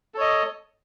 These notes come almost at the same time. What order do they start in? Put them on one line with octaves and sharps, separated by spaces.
A4 C#5 D#5